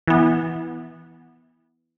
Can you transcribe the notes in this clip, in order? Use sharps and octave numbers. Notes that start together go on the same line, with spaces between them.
E3 B3